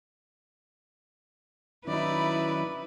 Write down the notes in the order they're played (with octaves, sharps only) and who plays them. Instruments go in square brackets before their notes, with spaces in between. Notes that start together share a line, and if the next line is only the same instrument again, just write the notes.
[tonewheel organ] D#3 F#3 C#4 [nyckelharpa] D#4 D5 [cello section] E4 [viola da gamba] B4